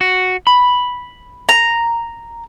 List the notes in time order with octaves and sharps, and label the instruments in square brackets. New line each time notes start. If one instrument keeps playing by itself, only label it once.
[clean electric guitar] F#4
B5
[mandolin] A#5